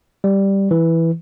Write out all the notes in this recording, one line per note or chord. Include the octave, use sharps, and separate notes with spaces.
G3
E3